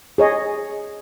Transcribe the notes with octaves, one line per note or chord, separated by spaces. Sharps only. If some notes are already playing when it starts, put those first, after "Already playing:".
G#4 C#5 D#5